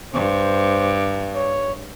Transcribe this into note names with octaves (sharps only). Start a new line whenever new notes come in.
G2 C5
C#5